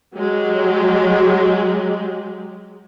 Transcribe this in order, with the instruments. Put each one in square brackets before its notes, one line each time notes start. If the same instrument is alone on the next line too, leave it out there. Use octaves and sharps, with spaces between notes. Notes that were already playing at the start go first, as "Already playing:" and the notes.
[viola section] F#3 G#3 G4